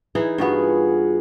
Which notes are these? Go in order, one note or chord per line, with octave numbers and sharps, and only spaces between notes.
E3 D#4 G#4
G2 B3 F4 F#4 G#4